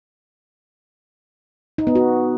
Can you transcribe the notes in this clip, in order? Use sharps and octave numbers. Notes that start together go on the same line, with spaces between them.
D#4
B3
F#4